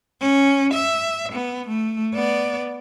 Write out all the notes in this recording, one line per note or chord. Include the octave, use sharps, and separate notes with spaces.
C#4
E5
B3
A3
B3 D5